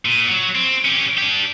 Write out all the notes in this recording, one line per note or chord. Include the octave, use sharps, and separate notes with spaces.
A#2
F#3 F#4
C4
C#4 G4
D4 G4